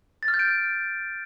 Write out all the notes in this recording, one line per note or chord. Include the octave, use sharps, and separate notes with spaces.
A6
F6
G6
D7